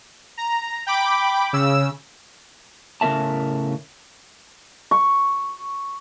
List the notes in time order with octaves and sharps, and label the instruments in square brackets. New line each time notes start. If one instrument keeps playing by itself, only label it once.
[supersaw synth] A#5
G5 B5 D6
C#3 E6
[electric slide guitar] A2 C#3 C#4 A#4 E5 A5
[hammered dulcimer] C#6